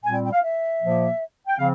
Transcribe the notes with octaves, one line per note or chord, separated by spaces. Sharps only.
A#2 G3 C4 G#5
G5
G5
F5
E5
A#2 F3 A#3
G5
C#3 F3 C4 F5